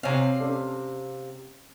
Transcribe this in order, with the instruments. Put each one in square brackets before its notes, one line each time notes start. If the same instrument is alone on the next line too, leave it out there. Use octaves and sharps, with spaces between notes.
[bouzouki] C3 F5 [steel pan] C4 C#5 G#5
[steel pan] C#4 A4 D5